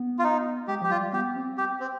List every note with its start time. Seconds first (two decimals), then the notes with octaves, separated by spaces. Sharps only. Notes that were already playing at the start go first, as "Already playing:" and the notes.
Already playing: B3
0.19 F4
0.24 D#4
0.68 G#3 G4
0.82 F3 G4
0.90 G3 F4
1.13 B3 G4
1.36 C4
1.58 G4
1.80 C4